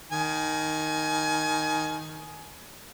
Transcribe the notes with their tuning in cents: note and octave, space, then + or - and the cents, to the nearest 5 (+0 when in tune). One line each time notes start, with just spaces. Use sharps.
D#3 +0 G#5 +25